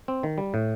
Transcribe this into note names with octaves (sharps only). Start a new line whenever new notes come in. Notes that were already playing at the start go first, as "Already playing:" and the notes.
C4
D#3
G3
A2